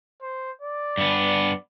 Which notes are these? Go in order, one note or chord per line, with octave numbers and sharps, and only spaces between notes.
C5
D5
G2 B3